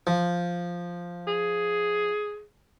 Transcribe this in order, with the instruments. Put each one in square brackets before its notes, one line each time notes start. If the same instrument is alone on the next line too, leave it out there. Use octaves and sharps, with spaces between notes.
[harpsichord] F3
[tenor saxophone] G#4